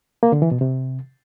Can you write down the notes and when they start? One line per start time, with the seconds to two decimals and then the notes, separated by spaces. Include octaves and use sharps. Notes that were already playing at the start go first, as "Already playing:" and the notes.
0.23 A#3
0.32 D3
0.42 E3
0.51 B2
0.61 C3